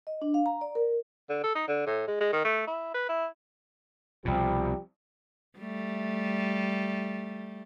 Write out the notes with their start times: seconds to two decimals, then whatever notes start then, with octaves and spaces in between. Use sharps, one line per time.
0.07 D#5
0.22 D4
0.34 F5
0.46 A#5
0.61 D5
0.75 A#4
1.29 D3
1.44 A4
1.55 D#4
1.68 D3
1.87 A2
2.08 G#3
2.20 G#3
2.33 D#3
2.45 A3
2.67 E4
2.94 B4
3.09 E4
4.25 C2 B2 F3 G3 G4
5.59 G3 A3